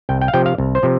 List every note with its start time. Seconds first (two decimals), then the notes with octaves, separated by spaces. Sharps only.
0.09 C2 G5
0.22 G5
0.28 F5
0.34 C3 F3 G5
0.46 F5
0.58 C2
0.75 C5
0.83 C3 F3